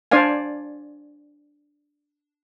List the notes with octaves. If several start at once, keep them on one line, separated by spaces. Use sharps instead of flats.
D4 C5 D5 F5 G#5